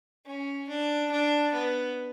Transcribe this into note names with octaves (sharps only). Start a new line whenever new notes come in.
C#4
D4
D4
B3